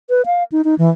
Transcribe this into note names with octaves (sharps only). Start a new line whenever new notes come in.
B4
F5
D#4
D#4
E3